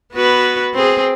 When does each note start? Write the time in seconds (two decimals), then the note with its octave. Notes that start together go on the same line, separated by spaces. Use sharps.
0.13 B3 F#4 B4
0.74 C4 G#4